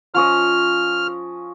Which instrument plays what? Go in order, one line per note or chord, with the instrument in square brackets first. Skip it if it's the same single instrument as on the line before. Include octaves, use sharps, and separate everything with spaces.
[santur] F3 C#4 D#5 [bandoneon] F6